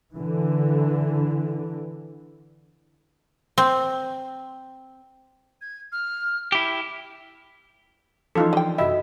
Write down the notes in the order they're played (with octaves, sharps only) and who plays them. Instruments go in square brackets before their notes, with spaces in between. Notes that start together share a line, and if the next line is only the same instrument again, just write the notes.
[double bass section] D3 E3
[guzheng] C4
[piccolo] G#6
F6
[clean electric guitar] E4 G4
[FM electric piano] E3 F3 C#4 [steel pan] D#4 F4 A4
[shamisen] D3 G5
[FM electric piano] F#2 C3 B5 [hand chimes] F#4 D#5 [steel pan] E5